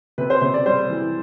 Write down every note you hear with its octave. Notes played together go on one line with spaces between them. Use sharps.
C3 B4
C5
C3 C5
D5
G3 C5
E3